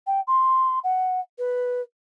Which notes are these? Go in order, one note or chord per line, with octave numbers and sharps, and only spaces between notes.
G5
C6
F#5
B4